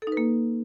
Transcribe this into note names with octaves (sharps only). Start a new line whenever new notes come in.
A4
D#4
B4
A#3